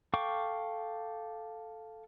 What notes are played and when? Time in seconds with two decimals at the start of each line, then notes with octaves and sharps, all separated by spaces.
0.14 A4 F5 G5 C#6 D6